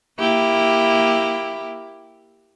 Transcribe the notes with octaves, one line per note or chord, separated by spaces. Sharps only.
A#3 E4 G4